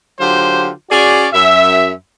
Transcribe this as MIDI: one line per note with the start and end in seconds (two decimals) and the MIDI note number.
0.20 0.70 50
0.20 0.70 54
0.20 0.70 65
0.20 0.70 67
0.20 0.70 72
0.90 1.26 61
0.90 1.26 66
0.90 1.26 68
0.90 1.26 74
1.33 1.91 42
1.33 1.91 76